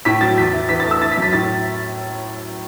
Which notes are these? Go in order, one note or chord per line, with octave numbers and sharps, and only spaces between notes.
A2 B6
F#3 A6
E2 B6
E4
E3 B6
A6
A3
E6
E4 A6
B6
F#2
B6
A2 A6